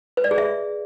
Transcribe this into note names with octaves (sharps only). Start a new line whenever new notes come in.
B4
D5
G#4
E5